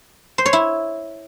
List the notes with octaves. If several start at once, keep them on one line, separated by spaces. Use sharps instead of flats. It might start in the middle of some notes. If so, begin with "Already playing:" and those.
C5
C#5
E4